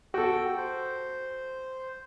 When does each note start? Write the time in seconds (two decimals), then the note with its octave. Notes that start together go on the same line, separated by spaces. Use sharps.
0.14 F#4 A4 G5
0.58 C5